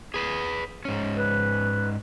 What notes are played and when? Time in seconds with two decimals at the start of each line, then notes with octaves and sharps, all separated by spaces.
0.14 G#4 B4
0.85 G#2 C#4
1.16 B4